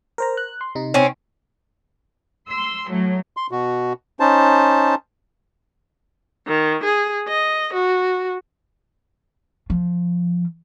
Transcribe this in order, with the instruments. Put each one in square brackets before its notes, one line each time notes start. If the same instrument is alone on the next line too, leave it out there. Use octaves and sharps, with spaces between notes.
[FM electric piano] A#4 C5 A#5
F#6
C6
C3 D#4
[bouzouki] C4 C#4
[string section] C6 E6
A2 F#3
[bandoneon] C6
B2 F#4
C#4 D#4 C5 A5
[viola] D#3
G#4
D#5
F#4
[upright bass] F3